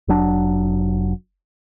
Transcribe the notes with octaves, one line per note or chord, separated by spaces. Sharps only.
F1 F#3 D4